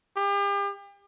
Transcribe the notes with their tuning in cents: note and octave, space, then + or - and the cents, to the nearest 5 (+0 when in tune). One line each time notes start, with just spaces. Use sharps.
G4 +40